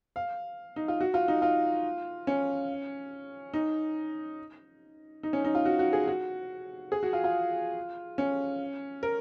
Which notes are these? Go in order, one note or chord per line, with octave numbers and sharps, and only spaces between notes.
F5
D#4
F4
F#4
F4
D#4
F4
C#4
D#4
D#4
C#4
D#4
F4
F#4
F#4
G#4
F#4
G#4
F#4
F4
F4
C#4
A#4